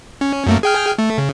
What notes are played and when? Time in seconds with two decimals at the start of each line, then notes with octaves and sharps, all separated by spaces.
0.21 C#4
0.47 F#2 A3 A#3
0.63 G#4 G5 F6
0.98 A3
1.18 C#3